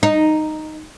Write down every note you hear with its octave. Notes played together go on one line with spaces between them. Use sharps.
D#4